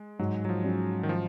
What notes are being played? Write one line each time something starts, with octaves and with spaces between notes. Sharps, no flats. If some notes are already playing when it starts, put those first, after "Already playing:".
Already playing: G#3
G#2 F#3
F#3
F3
F#3 C#4
D#3
F3